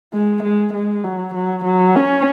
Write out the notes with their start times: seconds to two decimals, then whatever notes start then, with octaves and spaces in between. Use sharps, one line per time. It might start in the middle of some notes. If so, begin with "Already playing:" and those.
0.14 G#3
0.43 G#3
0.74 G#3
1.04 F#3
1.34 F#3
1.65 F#3
1.95 C#4